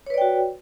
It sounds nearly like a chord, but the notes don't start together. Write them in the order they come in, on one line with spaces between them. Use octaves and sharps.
C#5 B4 D5 G5 F#4